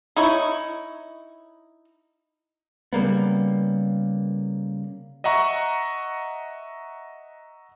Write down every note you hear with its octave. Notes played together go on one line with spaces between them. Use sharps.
D#4 E4 C#5
C#3 G3 A#3 B3
D#5 E5 F#5 A#5 C#6